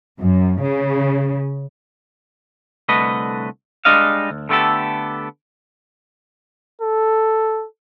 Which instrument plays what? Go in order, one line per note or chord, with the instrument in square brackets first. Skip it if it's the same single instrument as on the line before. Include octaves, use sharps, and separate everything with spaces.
[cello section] F#2
C#3
[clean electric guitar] C2 D3 A3 B4 D#5
G3 G#3 D4 D#5 F5
D2
D3 A3 B3 G4 A4
[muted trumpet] A4